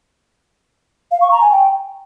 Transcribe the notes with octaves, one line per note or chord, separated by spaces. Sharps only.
F5
C#6
A#5
G#5
G5